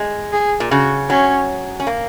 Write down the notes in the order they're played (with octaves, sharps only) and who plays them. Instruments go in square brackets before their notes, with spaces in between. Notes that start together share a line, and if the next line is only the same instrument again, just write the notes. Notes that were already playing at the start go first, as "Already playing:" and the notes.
Already playing: [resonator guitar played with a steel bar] G#3
[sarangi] G#4
[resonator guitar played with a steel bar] A#2
[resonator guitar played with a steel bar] C#3 [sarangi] F#4
[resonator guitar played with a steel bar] F#3 [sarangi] C#4
[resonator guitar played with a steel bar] C#4
A#3